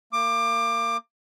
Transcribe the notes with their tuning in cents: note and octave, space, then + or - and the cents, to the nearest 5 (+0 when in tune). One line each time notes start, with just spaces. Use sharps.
A#3 -30 D6 +20